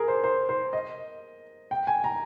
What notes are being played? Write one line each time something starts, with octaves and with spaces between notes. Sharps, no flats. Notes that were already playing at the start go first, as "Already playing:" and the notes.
Already playing: G#4 A#4
C5
C5
C5
D#5
G5
G#5
A#5